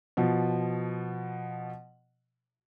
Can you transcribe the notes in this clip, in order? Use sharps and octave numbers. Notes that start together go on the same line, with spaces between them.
B2 F3